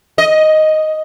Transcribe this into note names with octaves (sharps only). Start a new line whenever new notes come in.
D#5